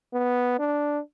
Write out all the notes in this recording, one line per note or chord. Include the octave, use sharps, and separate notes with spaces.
B3
D4